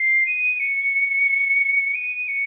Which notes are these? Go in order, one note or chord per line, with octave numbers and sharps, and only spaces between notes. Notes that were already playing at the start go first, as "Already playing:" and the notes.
Already playing: C7
D#7
C#7
D#7
C#7